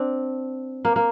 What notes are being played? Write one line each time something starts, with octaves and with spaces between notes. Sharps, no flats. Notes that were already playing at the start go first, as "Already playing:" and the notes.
Already playing: C4 D4
A#3
A#3